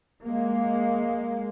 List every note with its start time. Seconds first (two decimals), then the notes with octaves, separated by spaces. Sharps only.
0.24 G#3 A#3